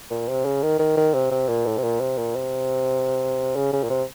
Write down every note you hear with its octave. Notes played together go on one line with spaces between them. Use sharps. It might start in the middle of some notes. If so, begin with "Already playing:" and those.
A#2
C3
C#3
D#3
D#3
D#3
C3
C3
A#2
A2
C3
A#2
C3
A#2
C3
C#3
C#3
A#2
C3